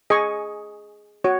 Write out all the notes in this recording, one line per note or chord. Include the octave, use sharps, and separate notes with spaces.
G#4 D#5 G#5 C#6
F#4 C#5